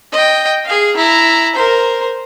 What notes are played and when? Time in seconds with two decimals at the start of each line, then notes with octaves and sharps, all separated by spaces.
0.13 D#5 G5
0.65 G#4 F5
0.96 E4 A#5
1.55 A#4 C5